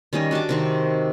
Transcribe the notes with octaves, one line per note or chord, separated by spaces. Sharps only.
D#3 G3 C#4 D#5
D4 F#4 A5 D6
C3 D#3 C4